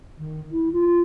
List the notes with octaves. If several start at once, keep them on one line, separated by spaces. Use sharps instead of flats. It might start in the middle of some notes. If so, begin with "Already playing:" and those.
D#3
E4
F4